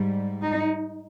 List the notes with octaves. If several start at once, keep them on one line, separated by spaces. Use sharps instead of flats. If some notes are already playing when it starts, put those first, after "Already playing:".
Already playing: G#2 G3
D#4